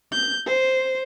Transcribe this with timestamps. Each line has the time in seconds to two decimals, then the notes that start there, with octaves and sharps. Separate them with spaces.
0.12 G6
0.46 C5